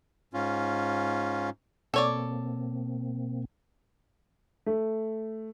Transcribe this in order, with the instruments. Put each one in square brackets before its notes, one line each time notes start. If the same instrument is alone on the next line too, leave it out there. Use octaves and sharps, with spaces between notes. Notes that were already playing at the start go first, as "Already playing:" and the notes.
[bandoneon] G#2 C#4 F4
[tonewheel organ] B2 A#3 C4 [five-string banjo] A4 C#5 D5
[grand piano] A3